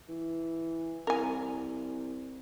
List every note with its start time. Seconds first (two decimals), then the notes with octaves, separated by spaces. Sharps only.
0.08 E3
1.07 C2 A#4 G#5